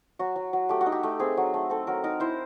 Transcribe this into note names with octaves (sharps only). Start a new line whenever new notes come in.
F#3 F#4
F#3
F#3
A3 G4
F#4
D#4
G4
A3
C4 G#4
F#3
A3
C4 A4
F#3 A#4
D#4 A#4
E4 C5